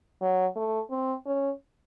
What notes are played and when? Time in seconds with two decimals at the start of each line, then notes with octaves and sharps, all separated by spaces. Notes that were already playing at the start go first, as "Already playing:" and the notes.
0.22 F#3
0.56 A3
0.91 C4
1.26 C#4